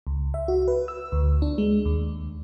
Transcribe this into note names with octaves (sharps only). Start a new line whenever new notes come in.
C#2
E5
F#4
B4
E6
D2
D4
G#3
D#2